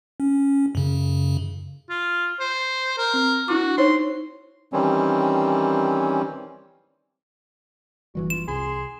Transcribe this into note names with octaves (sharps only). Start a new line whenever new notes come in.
C#4
F#2 C#3
F4
C5
A#4
C4
D4 E4 F#4 D6
D#4 C5 C#5 C6
D#3 E3 G3 C4 C#4
F#1 E3 G3 F#4
F4 E7
C2 G#4 C6